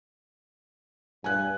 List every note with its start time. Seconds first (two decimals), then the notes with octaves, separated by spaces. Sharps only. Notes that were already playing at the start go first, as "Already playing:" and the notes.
1.24 G2 G#5 F#6